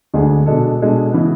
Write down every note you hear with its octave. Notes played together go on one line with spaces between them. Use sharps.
D2 D3 G#3 D4 G#4
B2 G#3 D4 A4
B2 G#3 D4 A4
C#3 E3 B3